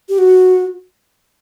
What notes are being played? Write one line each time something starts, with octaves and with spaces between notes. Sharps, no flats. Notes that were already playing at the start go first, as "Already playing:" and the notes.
G4
F#4